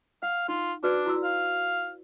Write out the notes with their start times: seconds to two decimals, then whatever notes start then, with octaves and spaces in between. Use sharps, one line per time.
0.23 F5 F#5
0.49 D#4 F4
0.84 D4 F#4 B4 D5
1.06 E4 F#4 E6
1.23 F5